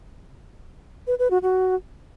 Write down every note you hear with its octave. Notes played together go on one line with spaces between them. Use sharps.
B4
B4
F#4
F#4